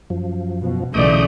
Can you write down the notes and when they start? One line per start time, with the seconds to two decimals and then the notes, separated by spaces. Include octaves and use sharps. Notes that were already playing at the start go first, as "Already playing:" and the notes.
0.10 F#2 F3
0.60 B2
0.94 B1 C#3 E3 A3 D5 D#5 D#6 G6